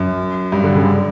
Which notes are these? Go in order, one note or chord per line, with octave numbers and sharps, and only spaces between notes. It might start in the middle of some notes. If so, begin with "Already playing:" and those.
Already playing: F#2
G2
D3
C#3